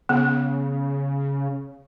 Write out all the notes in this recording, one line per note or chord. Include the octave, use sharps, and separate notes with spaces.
C#3 B3